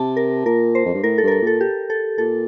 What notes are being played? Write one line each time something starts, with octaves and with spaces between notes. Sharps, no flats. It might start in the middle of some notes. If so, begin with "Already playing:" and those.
Already playing: C3 A5
A#4
A#2 A#4
C5
F2
G2
A2 A#4
A4
G2 A#4
A4
A#2 A4
G4
A4
A#2 A4